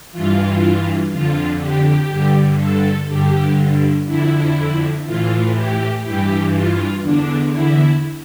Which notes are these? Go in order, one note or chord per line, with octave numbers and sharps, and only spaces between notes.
G2 E3 F4
F2 D3 F4
G4
G2 D3
A4
G2 D3 G4
F2 D3 E4
A2 E3 F4
G4
G2 E3 G4
F4
E2 D3 D4
E4